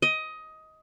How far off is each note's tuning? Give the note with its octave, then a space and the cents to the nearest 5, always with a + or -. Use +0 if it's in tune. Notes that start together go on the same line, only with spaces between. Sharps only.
D#5 +15